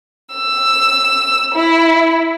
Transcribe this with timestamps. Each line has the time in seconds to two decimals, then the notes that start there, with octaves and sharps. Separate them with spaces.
0.34 E6
1.54 E4